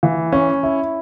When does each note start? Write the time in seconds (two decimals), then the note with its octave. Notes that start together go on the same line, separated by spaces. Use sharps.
0.03 E3
0.32 C#4
0.63 E4